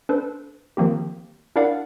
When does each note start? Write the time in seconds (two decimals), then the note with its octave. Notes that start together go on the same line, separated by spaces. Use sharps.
0.09 D4 A4 B4 C5
0.77 D#3 F3 A#3 C4 G4
1.56 D4 E4 A#4 D5 F5 F#5